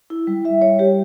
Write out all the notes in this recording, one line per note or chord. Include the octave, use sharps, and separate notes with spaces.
E4
G3
G3 E5
G3 C#5
G3 G4